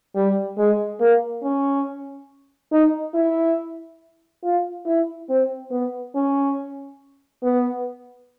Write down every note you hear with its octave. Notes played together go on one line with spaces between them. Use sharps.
G3
G#3
A#3
C#4
D#4
E4
F4
E4
C4
B3
C#4
B3